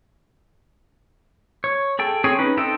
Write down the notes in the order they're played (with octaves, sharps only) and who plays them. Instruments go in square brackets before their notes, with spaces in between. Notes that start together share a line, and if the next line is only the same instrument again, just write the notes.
[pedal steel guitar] C#5
G#4 A4 G5
C4 G#4 C#5 G5 G#5
C#4 D#4 B4
C4 D#4 A4 E5 G5